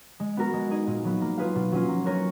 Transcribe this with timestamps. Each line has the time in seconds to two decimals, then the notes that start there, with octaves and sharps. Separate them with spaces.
0.20 G#3
0.37 B3 F#4 A#4
0.53 G#3
0.71 D#4 G#4 D#5
0.87 A#2
1.05 F#3 B3
1.21 A#3
1.38 F4 G#4 B4 F5
1.55 B2
1.72 F#3 C#4 F4
1.88 A#3
2.06 C#4 F#4 A#4 C#5